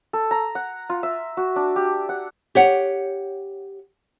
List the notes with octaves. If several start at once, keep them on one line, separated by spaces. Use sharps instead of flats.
A4
A#5
F#5
F4
E5
F#4
D4
G4
F#5
G4 C#5 F#5